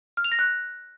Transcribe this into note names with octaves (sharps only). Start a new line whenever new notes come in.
F6
F7
A#6
F#6